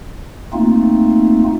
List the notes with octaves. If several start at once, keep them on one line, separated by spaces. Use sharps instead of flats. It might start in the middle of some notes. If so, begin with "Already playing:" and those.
A3 A#3 C4 D#4 F4